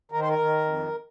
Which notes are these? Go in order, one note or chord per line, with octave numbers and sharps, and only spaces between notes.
D#3 A#4
C5
A#4
D#3
F2